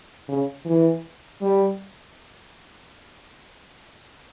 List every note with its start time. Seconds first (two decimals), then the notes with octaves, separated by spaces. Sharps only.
0.29 C#3
0.66 E3
1.41 G3